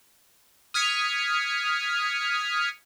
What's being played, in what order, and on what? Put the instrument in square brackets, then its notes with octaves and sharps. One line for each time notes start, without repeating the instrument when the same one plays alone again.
[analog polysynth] D#6 F6 G#6 B6 C#7